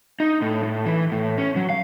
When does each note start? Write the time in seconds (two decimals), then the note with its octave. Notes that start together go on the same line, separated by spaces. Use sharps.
0.20 D#4
0.42 A2
0.63 A2
0.86 E3
1.12 A2
1.38 C#4
1.56 F#3
1.70 F5